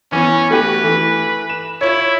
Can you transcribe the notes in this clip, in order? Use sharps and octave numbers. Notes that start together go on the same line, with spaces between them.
E3 B3 C#4
A3 F#4 G4 B4
E3 A3
E7
E4 F4 C#5